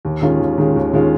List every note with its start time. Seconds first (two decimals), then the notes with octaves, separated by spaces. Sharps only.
0.05 D#2
0.22 D#3 G#3 C#4 F4
0.40 D#2
0.58 D#3 G#3 C#4 F4
0.76 D#2
0.93 D#3 G#3 C#4 F4